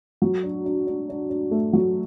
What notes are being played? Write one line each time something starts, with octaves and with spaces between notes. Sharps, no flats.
F#3
D4
D4
D4
D4
D4
A3
F#3